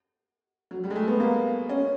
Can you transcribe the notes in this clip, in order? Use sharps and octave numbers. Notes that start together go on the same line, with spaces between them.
F#3
G3
G#3
A3
B3
A#3
C#4